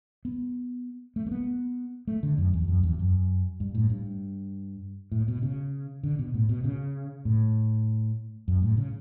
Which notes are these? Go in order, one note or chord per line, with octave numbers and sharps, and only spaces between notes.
B3
A3
A3
B3
A3
D3
F#2
E2
F#2
E2
F#2
G2
A2
G2
A2
B2
C#3
D3
B2
A2
B2
C#3
A2
F#2
A2
C#3